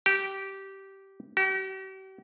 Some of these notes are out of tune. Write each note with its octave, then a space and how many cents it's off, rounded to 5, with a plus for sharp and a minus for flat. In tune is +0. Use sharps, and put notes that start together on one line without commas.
G4 -15
G4 -45